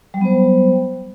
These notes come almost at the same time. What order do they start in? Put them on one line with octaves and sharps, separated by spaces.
G3 F#3 B3 C5